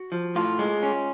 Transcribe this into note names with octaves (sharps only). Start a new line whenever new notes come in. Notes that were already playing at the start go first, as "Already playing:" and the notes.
Already playing: F#4
F3
A2 F4
G#3
C#4